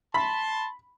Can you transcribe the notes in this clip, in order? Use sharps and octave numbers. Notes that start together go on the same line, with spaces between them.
A5 B5 C6